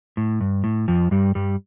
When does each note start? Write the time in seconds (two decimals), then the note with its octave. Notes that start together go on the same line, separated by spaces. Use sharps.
0.17 A2
0.41 G2
0.64 A2
0.88 F2 F3
1.11 G2 G3
1.35 G2 G3